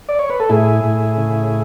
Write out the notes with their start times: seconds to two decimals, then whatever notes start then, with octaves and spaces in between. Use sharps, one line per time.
0.09 D5
0.19 C#5
0.30 B4
0.40 A4
0.49 A2 E4 G#4
0.84 A2
1.17 C#3